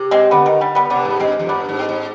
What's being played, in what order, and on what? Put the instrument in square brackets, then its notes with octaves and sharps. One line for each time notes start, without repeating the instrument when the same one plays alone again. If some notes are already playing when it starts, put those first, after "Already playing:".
Already playing: [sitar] C3
[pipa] G#3 C4
[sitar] D3 [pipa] G3 B3
[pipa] D#3
G3
G3 B3
[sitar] C3 [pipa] B3 D4
[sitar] G#2
[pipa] B3
[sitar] G2 [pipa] G#3 C4
[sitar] F2
[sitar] G2 [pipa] B3 D4
[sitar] G#2
[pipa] C4 D#4
[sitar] G#2